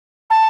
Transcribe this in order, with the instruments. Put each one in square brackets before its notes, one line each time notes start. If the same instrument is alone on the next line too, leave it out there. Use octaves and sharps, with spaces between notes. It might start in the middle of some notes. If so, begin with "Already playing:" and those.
[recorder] A5